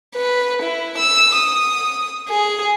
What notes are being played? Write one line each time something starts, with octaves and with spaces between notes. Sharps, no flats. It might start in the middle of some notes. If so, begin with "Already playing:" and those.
B4
E4
E6
D#6
G#4